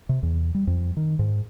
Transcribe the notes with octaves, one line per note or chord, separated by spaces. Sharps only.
C3
E2
G3
F2
D#3
G#2